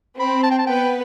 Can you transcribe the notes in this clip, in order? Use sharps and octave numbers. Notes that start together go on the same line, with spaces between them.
C4 B5
A5
G5
A5
B3 B4 G5